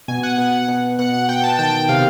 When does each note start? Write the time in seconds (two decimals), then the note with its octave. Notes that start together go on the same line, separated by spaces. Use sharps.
0.08 B2 G#5
0.23 F#5
0.38 B2 F#5
0.68 B2
0.99 B2 F#5
1.14 F#5
1.29 B2 G5
1.44 A5
1.59 D#3 G5
1.89 C3 F5